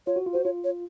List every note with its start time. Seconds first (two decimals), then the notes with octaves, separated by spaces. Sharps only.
0.07 F4 C#5
0.16 F#4
0.26 F4
0.33 F#4 C5
0.44 F4 C#5
0.64 C#5